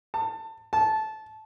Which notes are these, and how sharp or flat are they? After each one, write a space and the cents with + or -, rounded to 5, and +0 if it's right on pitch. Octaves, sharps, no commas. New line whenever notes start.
A5 +25
A5 -15